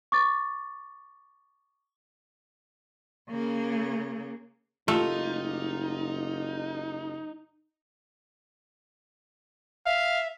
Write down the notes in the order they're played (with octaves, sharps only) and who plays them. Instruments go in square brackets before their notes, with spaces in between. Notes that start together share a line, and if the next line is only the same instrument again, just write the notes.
[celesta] C#6 D6 A6
[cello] C#3 A#3
[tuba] F#1 [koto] A3 [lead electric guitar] D#4 [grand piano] F4 G4
[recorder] E5 [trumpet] F5